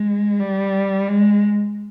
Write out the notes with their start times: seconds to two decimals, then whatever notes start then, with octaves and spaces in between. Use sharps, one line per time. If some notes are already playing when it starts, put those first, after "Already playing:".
Already playing: G#3
0.39 G3
1.08 G#3